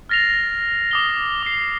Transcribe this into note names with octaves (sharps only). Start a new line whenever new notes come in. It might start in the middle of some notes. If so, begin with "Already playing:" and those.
F6 A6 A#6 C7 F7
D6 D#6 G7
D6 C7